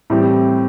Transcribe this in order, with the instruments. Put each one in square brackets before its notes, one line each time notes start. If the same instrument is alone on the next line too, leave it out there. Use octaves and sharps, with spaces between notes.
[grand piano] A2 E3 G3 C4 G4